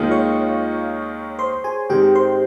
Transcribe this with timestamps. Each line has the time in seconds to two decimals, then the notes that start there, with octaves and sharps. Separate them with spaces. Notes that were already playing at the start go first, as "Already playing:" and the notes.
Already playing: D#2 D#3 G#3 D#4 F4 F5
0.11 C#5 C#6
1.39 C5 C6
1.64 G#4 G#5
1.90 G#2 D#3 G#3 C4 G4 G5
2.15 C5 C6